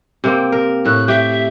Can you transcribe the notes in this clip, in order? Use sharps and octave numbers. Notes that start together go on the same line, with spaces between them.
C3 A#3 C4
A#4
A2 F#6
G4 E5